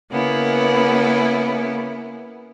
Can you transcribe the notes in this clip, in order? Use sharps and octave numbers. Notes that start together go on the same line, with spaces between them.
C#3 A#3 B3 E4